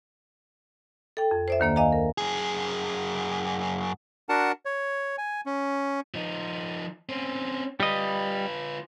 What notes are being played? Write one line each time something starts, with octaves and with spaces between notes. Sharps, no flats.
A4 G5
F2
C5 D5 E5
D2 D#3 A#3 D5
D#5 F5 G#5 A#5
A#4
F#2 G#4
D4 F#4 A#4 F#5 A5
C#5
G#5
C#4
F3 D#4
C4 C#4
G3 F4 B4 D#5